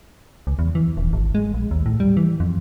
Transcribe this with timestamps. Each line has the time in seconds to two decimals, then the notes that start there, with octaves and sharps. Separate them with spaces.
0.47 C#2
0.59 E2
0.75 E3
0.97 D#1
1.13 G#1
1.35 G#3
1.54 A#1
1.71 D#2
1.86 A2
2.00 G3
2.17 E3
2.40 F2